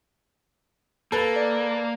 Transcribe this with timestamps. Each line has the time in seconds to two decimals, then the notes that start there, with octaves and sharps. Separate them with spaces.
1.12 A#3 A4 B4
1.36 D5